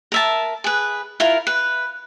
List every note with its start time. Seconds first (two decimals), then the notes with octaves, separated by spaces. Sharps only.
0.12 A#4 E5 A5
0.64 G#4 B4
1.20 E4 F4 A#4
1.47 B4